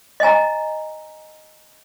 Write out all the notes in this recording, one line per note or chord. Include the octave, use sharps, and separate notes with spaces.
D#5 E5 G#5 A#5